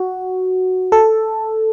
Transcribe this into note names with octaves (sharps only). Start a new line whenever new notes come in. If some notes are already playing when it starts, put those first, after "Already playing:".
Already playing: F#4
A4